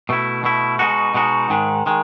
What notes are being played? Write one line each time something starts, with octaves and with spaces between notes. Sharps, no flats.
B2 A3 E4
B2 A3 E4
B2 G#3 D#4 F#4
B2 G#3 D#4 F#4
G#2 D#3 G#3
D#3 G#3